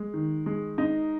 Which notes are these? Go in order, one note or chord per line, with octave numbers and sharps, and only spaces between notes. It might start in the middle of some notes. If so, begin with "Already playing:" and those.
Already playing: G#3
D#3
G#3
D#4